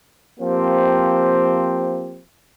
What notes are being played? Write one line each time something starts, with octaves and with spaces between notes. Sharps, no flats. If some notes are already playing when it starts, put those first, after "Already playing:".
F3 A#3 C4 G4